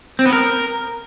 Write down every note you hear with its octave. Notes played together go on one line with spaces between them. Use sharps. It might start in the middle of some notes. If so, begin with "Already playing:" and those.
C4
B3
A#4